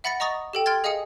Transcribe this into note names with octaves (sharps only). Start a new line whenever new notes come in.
E5 F#5 B5 A6 A#6 C#7
D#5 A#5 C#6 D#6 A6 A#6
G4 A4 G5
G5 C6 F6 G#6 A6
G#4 D#5 F5 G#5 D#6 C#7